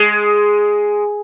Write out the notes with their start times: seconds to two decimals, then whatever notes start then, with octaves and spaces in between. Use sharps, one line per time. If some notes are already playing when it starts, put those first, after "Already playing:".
Already playing: G#3